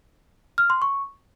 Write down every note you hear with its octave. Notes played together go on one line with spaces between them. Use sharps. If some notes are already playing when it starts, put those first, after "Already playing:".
F6
C6
C#6